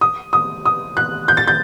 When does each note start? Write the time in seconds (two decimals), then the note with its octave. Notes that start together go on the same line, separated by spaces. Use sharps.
0.01 D#6
0.33 D#6
0.65 D#6
0.97 F#6
1.28 G6
1.37 A6
1.48 G6